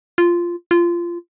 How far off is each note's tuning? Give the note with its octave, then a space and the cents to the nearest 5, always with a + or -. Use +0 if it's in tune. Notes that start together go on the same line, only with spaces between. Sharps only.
F4 -10
F4 -20